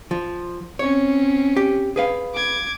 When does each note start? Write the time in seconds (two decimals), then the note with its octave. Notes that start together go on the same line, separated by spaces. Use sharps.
0.11 F3
0.79 C4 C#4 C#5
1.57 G4
1.96 G#4 B4 F5
2.34 D6 G#6